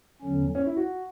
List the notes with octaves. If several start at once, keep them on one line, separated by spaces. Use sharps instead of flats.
E2 D3 F#3 C#4
C#4
E4
F#4